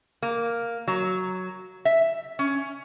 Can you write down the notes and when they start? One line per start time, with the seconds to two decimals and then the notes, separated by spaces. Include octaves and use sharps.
0.23 A#3
0.88 F#3
1.85 E5
2.39 C#4